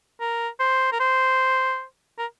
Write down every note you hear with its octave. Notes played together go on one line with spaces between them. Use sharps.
A#4
C5
A#4
C5
A#4